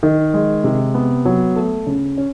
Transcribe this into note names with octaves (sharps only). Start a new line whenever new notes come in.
D#3
G#3
C3
B3
F#3
A3
C#3
C#4